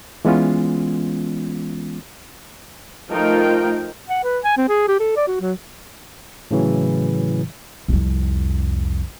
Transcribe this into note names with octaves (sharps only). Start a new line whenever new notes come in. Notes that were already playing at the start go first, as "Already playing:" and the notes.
E3 G#3 B3 C#4 F4
F3 A3 D#4 F4 A#4 G5
F#5
B4
G#5
C4
G#4
G4
A4
D5
F#4
F#3
A2 C#3 E3 F#3
C2 F2